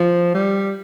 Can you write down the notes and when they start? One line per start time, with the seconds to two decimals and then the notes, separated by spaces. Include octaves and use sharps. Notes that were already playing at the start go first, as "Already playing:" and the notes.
Already playing: F3
0.34 G3